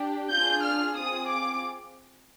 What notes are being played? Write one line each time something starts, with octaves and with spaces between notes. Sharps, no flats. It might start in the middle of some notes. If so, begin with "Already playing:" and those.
Already playing: D4 G4
D4 F4 G#4 G6
F6
C4 F4 G#4 D#6
D6